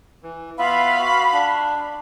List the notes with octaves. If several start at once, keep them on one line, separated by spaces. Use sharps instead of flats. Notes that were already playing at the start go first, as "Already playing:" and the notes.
E3
B3 F4 E5 F5 B5
F#4
D4